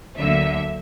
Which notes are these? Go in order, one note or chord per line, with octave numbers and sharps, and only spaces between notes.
D2 D3 F#3 A#3 E5